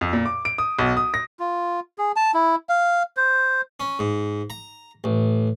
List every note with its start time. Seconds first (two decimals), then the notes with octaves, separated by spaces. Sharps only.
0.01 F2
0.13 A#2
0.26 D6
0.45 D7
0.58 D#6
0.79 B1
0.97 D#6
1.14 A#6
1.40 F4
1.98 G#4
2.16 A5
2.34 E4
2.69 F5
3.17 C5
3.80 C#4
3.99 G#2
4.50 A#5
5.04 A1